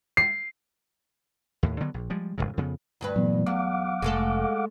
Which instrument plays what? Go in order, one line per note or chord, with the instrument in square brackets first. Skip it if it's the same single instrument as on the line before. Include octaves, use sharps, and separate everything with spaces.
[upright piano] C7
[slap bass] D#2 A2
D3 D#3 F#3 B3
A#1
F3 G3 G#3
E1 F2 G#2 C#3
F2 C#3 B3
[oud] D2 G2 B4
[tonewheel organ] A#2 E3 [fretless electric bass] F#3 B3
[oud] E2 [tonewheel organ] F5 F#5 D6
[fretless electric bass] F1 [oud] G#3 A3 A4